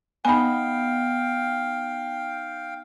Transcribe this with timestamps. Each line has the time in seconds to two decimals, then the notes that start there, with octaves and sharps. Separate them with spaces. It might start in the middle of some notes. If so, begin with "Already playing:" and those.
0.25 B3 D#4 F5 G5 G#5 B5